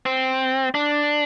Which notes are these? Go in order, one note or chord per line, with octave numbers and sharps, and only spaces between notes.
C4
D4